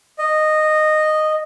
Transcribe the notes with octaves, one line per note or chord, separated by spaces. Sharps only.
D#5